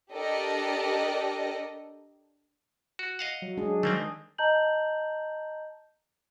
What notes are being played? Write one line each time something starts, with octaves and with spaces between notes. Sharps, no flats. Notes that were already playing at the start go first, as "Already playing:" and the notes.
D4 G4 A4 A#4 D5 D#5
F#4
D#5 F5 F#5
F#3
G#3 D4 G#4
D#3 A3 A#3 C4
D#5 A5 A#5 G6 F#7